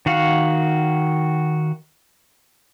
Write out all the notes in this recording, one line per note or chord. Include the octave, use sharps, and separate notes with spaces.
D#3 F#4 F5 F#5